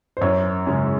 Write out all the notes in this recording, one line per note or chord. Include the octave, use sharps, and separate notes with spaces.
C5
F#2 C#5
C#3 G#3 C#4